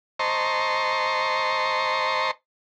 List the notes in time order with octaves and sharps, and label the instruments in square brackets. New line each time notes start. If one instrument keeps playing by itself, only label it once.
[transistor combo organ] C5 D#5 A5 A#5 C6 C#6